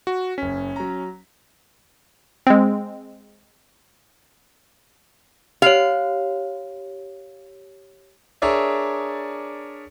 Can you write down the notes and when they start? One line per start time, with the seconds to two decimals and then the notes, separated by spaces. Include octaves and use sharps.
0.07 F#4
0.38 F#1 C#4 B6
0.76 F#3 A#5
2.47 G#3 C4
5.62 G4 C#5 F5
8.42 D4 G#4 A#4 C#5 D5 E5